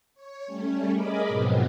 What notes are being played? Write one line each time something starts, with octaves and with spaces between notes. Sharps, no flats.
C#5
G3 A3 C#4
G#4 A#4 D#5 B5 D6
G#2 B2 F3 F#3 B3 C4